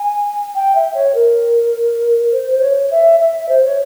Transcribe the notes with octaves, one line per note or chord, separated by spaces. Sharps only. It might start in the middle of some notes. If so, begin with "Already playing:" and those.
Already playing: G#5
G5
E5
C#5
A#4
C5
C5
C#5
E5
E5
C5
C#5